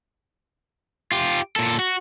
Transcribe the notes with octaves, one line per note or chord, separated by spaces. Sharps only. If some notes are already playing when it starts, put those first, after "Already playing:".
F4 G4
A#2 A4
F#4